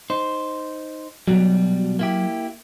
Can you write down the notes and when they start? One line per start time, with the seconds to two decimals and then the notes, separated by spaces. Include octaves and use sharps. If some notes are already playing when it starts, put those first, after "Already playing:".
0.10 D#4 C5
1.28 B2 F#3 G3
1.99 A#3 E4 G4